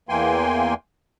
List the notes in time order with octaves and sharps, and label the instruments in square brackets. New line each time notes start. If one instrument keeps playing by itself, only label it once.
[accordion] E2 E3 A#3 G5 G#5 C6